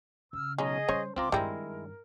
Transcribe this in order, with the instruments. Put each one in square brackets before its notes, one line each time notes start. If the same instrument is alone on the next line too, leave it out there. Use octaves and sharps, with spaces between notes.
[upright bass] C#3 [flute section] E6 F6
[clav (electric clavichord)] B1 C#4 A#5 [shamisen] G#3 [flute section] G#4 D#5
[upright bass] C#3 G3 [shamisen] C#4 C#5 [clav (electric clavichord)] C5
[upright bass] C#2 [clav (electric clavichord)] C4 F4 A#5 [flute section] C6 D6
[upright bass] G2 D#3 [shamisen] G3 C4 [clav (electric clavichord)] G#3 E4 A#5 [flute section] A#4